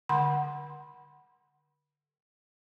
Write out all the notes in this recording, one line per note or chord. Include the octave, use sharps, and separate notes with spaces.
D3 F#5 C6